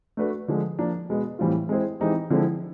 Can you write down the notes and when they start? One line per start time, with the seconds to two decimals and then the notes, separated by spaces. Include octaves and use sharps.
0.17 A3 D4 F#4 B4
0.48 D3 F3 G#3
0.79 F3 A#3 D4
1.09 B2 G#3 B3
1.39 A2 E3 G3 C4 F4
1.69 G#3 C4 E4 G#4 C5
2.00 E3 G#3 C4 D#4 G4
2.30 D3 F3 G#3 C4 E4